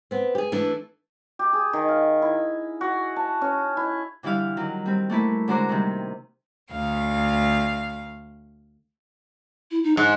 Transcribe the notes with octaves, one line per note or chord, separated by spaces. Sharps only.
B3 C4
G4 G#4
E3 A3 D4
G4
G#4
D#3
F5
E4
F#4
A5
C#4
E4
D3 E3 G3 E4 F5
D#3 F#3
G3 C4
A3 A#3 E4 B4
D3 G#3 F#4 C5 A#5 D6
C3 D#3 G3
D2 F5
E4
D#4
G#2 F#6